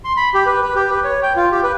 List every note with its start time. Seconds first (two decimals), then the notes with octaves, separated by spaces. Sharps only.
0.05 C6
0.17 B5
0.34 G4
0.46 B4
0.62 B4
0.75 G4
0.91 B4
1.04 C#5
1.23 G5
1.36 F4
1.52 G4
1.63 B4